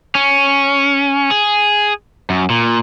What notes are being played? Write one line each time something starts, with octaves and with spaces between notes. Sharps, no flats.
C#4
G#4
F#2
A#2